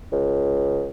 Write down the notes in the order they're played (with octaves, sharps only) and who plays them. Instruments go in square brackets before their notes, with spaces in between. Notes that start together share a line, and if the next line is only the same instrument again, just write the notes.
[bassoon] C#2